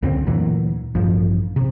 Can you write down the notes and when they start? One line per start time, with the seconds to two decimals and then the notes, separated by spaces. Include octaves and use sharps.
0.02 C#2 F#2 D3 C4
0.27 D2 A#2 E3 F#3
0.95 A1 G2 F3
1.56 C3